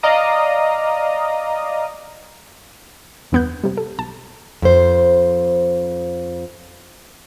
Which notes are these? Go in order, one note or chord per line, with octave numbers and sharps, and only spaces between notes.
D5 D#5 F5 A#5 D#6
E2 G2 B3 F#6 G6
C3 G3
A4
B1 A5
F2 C5